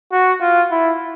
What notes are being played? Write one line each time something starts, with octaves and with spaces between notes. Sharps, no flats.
F#4
F4
E4